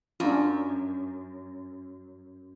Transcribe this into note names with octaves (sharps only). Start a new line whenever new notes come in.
F#2 D4 F4